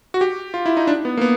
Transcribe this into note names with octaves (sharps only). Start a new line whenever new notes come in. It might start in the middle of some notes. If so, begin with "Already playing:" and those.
F#4
G4
F4
E4
D#4
D4
B3
A#3
B3